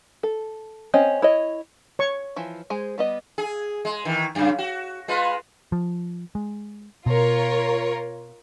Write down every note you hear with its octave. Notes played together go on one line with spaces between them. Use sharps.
A4
C4 C#4 D#5
E4 C#5 D#5
C#5 C#6
E3 F3
G#3 G#4 C5
G3 B3 D#5
G#4
G#3
D#3 E3
F#2 C#3
F#4
G#3 F4 B4
F3
G#3
B2 F4 A#4 C#5